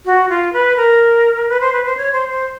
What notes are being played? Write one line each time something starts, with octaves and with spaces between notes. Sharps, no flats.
F#4
F4
B4
A#4
B4
C5
B4
C5
C#5
C5
C5